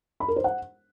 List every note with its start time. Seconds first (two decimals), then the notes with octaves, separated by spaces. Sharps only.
0.20 B5
0.28 A#4
0.36 C5
0.44 F#5